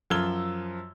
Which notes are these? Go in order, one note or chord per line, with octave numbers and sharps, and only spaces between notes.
F#2 F3 E6 G#6 G7